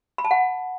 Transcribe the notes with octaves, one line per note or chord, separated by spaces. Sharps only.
B5
A5
F#5